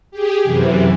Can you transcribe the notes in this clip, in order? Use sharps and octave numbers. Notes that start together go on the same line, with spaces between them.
G4 G#4
F#2 C3 E3